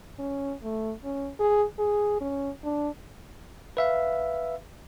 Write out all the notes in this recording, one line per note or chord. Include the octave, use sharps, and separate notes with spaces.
C#4
A3
C#4
G#4
G#4
C#4
D4
B4 E5 F5